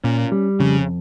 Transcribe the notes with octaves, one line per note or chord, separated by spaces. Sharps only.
A#2 C#4
G3
F2 C#3